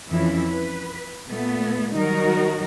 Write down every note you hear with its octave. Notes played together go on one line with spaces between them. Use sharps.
F2 E3 F3 C#4 E4
B4
A#2 A3 B3
D#3 F#3 G3 D#4 F#4 A#4